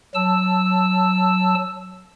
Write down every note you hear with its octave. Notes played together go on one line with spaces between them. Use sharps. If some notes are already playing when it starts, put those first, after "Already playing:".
F#3 A5 E6